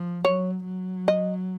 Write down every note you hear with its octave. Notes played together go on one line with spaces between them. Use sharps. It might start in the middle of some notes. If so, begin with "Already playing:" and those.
Already playing: F3
F#3 C#5
F#3
D#5